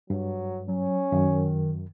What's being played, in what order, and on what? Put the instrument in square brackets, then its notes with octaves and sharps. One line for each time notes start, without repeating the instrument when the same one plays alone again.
[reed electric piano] G2 [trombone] F#3
[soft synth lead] F#3 [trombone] C#4
[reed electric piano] F#2 [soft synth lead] D#3